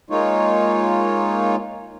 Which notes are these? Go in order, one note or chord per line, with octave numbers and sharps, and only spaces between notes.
G#3 A#3 D#4 F4 C#5